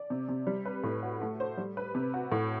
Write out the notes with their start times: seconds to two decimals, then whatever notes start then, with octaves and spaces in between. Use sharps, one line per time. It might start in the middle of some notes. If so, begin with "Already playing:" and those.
Already playing: D5
0.10 C3
0.29 C3
0.47 G3
0.66 B4
0.84 A2
1.03 F#4
1.21 A3
1.40 C5
1.57 G3
1.77 B4
1.95 C3
2.14 F#4
2.32 A2